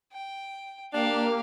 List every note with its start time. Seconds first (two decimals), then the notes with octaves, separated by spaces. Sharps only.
0.13 G5
0.93 A#3 D4 G4 F5